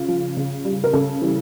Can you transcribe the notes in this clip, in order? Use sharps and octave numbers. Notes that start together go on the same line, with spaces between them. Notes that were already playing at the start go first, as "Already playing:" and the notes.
Already playing: C#3 F4
F3
C#3
G3
A#4
C#3 A4
E3 G3